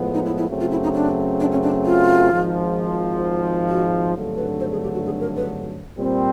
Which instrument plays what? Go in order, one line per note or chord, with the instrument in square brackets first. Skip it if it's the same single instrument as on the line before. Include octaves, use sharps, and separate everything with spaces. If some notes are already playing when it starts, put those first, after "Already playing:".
Already playing: [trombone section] A2 F3 G#3 B3
[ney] D#4
E4
E4
[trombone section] F#2 C#3 F#3 A3 C4
[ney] F4
E4
D#4
D4
D4
C#4
D4
F4
[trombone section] G#1 G#2 F3
[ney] F#4
[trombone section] G#1 G2 D3 F#3 A3
[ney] B4
C5
G#4
G4
F#4
G#4
A#4
B4
[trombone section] A#2 G3 C4